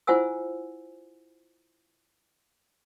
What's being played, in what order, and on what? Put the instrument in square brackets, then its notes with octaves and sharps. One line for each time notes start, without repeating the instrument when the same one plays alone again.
[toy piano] E4 F4 C5 F#5 G#5 E6